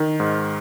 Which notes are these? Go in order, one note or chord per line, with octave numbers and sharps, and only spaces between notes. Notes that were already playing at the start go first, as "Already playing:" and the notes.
Already playing: D#3
G#2